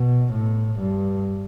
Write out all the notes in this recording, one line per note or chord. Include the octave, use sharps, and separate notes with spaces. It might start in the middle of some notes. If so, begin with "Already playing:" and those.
Already playing: B2
A2
G2